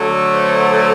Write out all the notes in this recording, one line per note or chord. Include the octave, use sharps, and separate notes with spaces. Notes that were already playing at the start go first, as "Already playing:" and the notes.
Already playing: D3 F#3 A3
C5